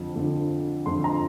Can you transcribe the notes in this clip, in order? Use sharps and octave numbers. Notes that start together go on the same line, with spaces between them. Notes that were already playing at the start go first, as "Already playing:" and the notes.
Already playing: F2 D3 F3
F2 D3 F3
F2 D3 F3 C6
A#5